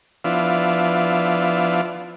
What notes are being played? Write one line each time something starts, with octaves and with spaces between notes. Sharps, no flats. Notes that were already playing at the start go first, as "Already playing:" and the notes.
F3 B3 D4 E4 F4